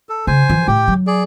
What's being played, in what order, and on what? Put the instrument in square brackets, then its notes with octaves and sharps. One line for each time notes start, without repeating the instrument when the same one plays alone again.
[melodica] A4
[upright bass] C#3 [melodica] C5 G#5
[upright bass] E3 F3
[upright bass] A2 [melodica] G4 G5
[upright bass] F#3
[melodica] G#4 D5